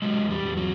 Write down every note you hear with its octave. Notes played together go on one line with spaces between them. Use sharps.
B2 F#3 G#3
E2
G3
E2
F#3